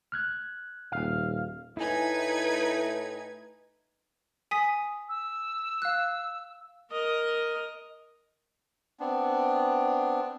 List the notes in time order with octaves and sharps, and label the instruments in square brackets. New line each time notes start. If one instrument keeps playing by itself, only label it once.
[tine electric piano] F6 F#6 G#6
[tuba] D#1 [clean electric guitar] F5
[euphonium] A2 [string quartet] D#4 B4 G#6 [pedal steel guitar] E4 G#5
[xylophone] G#5 D#6 B6
[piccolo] E6
[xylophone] F5 F#6
[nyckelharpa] A#4 D#5
[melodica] B3 C4 D4